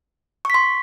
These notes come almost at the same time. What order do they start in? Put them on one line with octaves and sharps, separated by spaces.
C#6 B6 C6